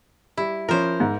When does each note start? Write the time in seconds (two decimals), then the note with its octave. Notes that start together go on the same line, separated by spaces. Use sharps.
0.37 G3 E4
0.69 F3 C#4 A#4 C5
1.00 G#2